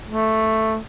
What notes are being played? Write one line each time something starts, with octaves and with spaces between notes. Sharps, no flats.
A3